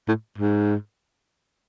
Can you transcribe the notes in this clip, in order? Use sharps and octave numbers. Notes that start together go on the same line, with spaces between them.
A2
G#2